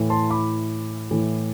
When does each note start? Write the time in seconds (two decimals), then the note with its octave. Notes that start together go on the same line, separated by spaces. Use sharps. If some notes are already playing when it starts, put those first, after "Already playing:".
Already playing: A2 E3
0.10 A5 C6
0.30 B5 D6
1.11 A2 E3